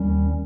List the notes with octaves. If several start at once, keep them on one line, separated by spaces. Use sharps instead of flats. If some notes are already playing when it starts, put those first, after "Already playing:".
Already playing: D#2 D#3 G3 C#4